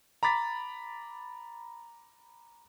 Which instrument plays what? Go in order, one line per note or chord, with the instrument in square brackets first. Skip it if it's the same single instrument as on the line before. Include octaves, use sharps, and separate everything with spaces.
[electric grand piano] A#5 B5 D6 A6 B6